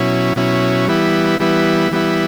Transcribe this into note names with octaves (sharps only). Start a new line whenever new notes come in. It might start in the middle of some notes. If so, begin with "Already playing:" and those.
Already playing: B2 F#3 C#4 E4
B2 F#3 C#4 E4
E3 G3 B3 E4
E3 G3 B3 E4
E3 G3 B3 E4